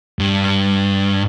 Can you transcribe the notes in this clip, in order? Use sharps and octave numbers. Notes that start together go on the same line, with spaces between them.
G2